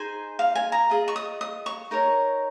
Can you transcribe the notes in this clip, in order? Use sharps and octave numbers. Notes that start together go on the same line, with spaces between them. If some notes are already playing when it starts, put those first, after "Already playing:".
Already playing: D#4 G#4 C5 G#5
F5
G#5
A#5
F4 G#4 D#5
C#6
D#6
D#6
C#6
D#4 A#4 C#5